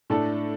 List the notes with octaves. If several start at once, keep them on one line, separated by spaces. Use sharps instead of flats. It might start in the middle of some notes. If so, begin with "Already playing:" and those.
A2 A3 D4 A4